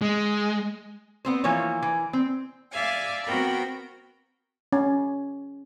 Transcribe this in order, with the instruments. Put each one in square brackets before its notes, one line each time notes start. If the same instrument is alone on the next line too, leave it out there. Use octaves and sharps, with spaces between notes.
[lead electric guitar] G#3
[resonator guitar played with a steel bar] B3 C4 C5
E3 F3 A#3 C#5
E3
C4
[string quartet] D5 E5 F5 G#5
B3 C4 F#4 A#4 G5 B5
[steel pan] C#4